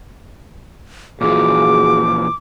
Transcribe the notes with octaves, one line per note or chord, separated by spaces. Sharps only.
A#2 E3 F3 F4 F#4 G#4 D6